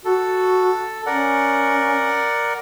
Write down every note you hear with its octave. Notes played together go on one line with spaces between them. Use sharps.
F#4 A4
C#4 A#4 D5 F#5